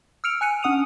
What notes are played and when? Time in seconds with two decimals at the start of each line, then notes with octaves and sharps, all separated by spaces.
0.24 E6 F6 C#7 D7 F7
0.41 G#5 F#6 C#7 D#7
0.63 C#4 D4 F#5 D#6 D#7 F7